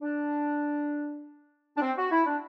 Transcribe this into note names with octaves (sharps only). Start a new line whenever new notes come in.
D4
D4
C4
F#4
E4
D4